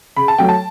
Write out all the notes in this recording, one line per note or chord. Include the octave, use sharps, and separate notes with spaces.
C#3 B5
A5
F#3 A3 G5
A5